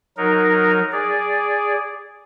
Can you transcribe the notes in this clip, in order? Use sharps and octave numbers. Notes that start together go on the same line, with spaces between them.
F#3 D#4 A#4
G#4 D5